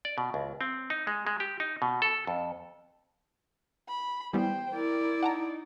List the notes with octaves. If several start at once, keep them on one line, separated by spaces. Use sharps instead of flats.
D5
B2
C#2
C4
D#4
G#3
G#3
G4
D#4
B2
A4
F2
B5
E3 G3 B3 C5 G5
E4 A#4 D5
D#4 F#5 A5 A#5